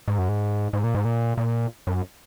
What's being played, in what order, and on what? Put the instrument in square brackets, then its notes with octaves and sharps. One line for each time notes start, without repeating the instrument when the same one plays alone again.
[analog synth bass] G#2
F#2
G#2
G#2
A#2
G#2
A#2
A#2
F#2